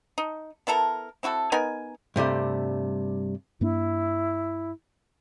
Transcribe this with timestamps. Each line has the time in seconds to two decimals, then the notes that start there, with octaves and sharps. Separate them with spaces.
0.18 D#4
0.67 B3 E4 A4 A#4
1.23 C4 E4 F#4 A4
1.52 B3 D#4 A#4 G#5
2.16 G2 C3 G3 A3
3.61 G2 A#3 D4 E4